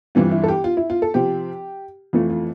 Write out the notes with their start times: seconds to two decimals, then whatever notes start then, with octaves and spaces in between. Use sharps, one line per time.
0.15 G2 E3 G3 C4 F4
0.31 E4
0.44 A4
0.48 G4
0.64 F4
0.77 E4
0.90 F4
1.02 A4
1.14 C3 F3 C4 G4
2.13 F2 E3 A3 F4
2.30 F4